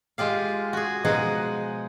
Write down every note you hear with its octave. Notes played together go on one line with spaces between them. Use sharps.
G#3 F4 G4 F5
F#4 G#4
B2 F3 G#3 D#4 G#4 F#5